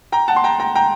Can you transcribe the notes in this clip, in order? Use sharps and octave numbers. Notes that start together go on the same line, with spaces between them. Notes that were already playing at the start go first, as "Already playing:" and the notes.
G5 A#5
F#5 A5
C6
G5 A#5
G5 A#5
G5 A#5